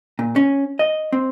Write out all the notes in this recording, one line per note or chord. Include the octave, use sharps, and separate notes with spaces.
A#2
C#4
D#5
C4